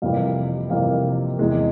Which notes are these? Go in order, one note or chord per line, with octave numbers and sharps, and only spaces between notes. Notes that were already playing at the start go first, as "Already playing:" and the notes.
F2 C3 E3 G3 A#3 F5
F2 C3 E3 G3 A#3 F5
E2 C3 E3 G#3